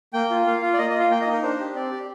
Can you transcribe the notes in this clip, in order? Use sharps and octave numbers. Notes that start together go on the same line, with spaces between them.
A#3 G5
F4
A#3 F5
F4
D5
A#3 D#5
D#5
F4
F5
A#3 G5
D#5
D#4
A#4
D4 C5
G4
C4 D5
G4